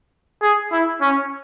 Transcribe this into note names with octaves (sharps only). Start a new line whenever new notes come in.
G#4
E4
C#4